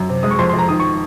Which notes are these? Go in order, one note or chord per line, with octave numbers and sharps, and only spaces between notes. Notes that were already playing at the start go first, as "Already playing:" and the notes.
Already playing: F#2
C3
G#3 D#6
C#6
F2 C6
C6
F2
A#5
D#3 D#6
C#6